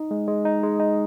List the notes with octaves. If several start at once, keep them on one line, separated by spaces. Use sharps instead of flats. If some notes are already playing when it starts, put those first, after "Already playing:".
Already playing: D#4
G#3
G#3
D#4
G#3
D#4